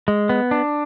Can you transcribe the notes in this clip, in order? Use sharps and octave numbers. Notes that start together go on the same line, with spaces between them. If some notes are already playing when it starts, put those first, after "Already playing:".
G#3
B3
D4